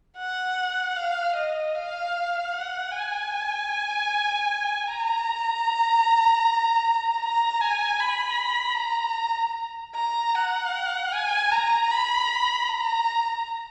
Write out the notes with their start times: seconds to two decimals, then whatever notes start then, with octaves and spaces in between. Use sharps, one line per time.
0.18 F#5
0.96 F5
1.35 D#5
1.75 F5
2.52 F#5
2.92 G#5
4.87 A#5
7.22 A#5
7.60 G#5
8.00 B5
8.77 A#5
9.95 A#5
10.35 F#5
11.12 G#5
11.52 A#5
11.91 B5
12.69 A#5